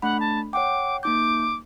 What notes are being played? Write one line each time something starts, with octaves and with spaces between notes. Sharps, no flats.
A3 D4 F#5 B5
A5
C#5 F#5 G5 D6
A#3 D#4 D6 G6